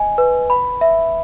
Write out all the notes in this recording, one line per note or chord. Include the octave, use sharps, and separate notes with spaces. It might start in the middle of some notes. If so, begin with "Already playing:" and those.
Already playing: D#5 G#5
B4
B5
E5